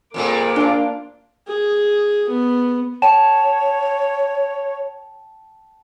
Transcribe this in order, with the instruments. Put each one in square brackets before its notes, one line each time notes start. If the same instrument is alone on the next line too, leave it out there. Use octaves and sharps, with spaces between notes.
[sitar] F2 A#2 G#3 [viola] A#3 D6
[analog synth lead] D4 [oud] F4 F5
[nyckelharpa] G#4
B3
[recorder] C#5 [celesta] G5 A5 E7